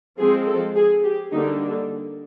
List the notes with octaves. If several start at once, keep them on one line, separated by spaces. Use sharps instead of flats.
F3 G#3 C4 G#4
A4
G#4
G4
D3 G3 A#3 D4 D#4